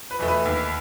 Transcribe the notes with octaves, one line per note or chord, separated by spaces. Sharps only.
B4
E2 B2 A3
B4
D#2